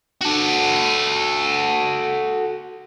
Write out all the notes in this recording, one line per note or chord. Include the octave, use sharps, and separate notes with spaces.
F#4 A4